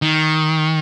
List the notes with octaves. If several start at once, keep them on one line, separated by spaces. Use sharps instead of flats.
D#3